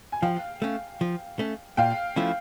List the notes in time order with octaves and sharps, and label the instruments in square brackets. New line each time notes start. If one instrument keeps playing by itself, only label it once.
[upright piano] G#5
[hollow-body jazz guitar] F3 [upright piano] F5 G5
[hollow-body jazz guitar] A3 C#4
F3
A3 C#4
[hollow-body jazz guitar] A#2 [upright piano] F5 G5
[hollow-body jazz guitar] F3 A3 C#4 E4